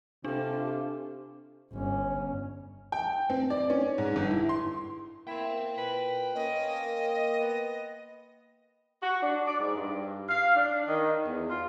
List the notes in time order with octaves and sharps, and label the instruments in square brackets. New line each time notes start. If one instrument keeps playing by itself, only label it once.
[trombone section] C3 [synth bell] D4 [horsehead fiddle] F4 A4 [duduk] G4
[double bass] G1 [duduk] C#4
[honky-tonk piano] G5
C4
D5
C#4
G#2
G1
E4
C6
[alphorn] A#3 [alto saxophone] E4 [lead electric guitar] G5 C6
[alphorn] A#2 [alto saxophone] B4
[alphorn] A#3 [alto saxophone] C#4 [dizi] D#5
[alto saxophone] B3
[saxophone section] F#4
D4
D5
G#2
G2
F5
D4
D#3
E2
F4